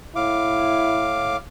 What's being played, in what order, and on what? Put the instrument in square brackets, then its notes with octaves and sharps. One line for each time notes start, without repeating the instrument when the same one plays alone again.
[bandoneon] A2 F5 D6 [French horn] E4